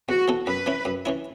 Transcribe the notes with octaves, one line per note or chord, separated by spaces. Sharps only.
E2 F#4
E3 B3 A4
F#2 B4
E3 C#4 E4
F#2
E3 C#4 E4